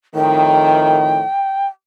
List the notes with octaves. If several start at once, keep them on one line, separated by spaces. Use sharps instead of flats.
F2 A2 D#3 G5